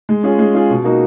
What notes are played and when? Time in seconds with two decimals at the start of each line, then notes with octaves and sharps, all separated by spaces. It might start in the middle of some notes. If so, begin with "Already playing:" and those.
0.09 G#3
0.23 C#4 F4 G#4
0.39 G#3
0.54 C#4 F4 G#4
0.70 B2
0.84 A#3 D#4 F#4